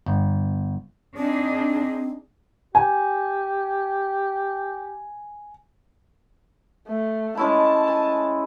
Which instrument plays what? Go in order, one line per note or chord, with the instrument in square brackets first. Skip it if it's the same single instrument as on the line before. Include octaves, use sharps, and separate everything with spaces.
[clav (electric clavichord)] G1
[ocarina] C4 [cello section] D4 D#4 G#4
[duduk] G4 [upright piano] G#5
[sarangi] A3
[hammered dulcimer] G#3 C#4 E4 [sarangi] A5
[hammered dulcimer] G#5